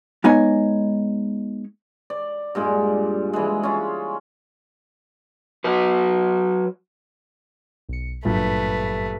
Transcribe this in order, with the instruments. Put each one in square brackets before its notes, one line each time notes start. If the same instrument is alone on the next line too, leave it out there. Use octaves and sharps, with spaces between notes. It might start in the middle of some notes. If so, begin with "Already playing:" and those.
[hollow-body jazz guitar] G#3 B3 D#4 C#5 D#5 G#5
[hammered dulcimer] D5
G2 A#2 G#3
E3 G#3
C#4 F4
[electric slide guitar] F#3 F#4 B4
[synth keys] B1 C#7
[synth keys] G#1 F#3 [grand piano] G2 A#2 [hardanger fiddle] A3 B4